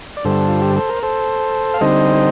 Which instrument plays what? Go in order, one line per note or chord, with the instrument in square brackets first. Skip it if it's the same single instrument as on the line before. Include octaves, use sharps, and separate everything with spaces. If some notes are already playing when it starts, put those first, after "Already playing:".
[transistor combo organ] D5
G2 D3 G3 A4 C5
F4
G4
A4
A#4
A4 C5
F5
D3 G3 C4 D#4 C5 D#5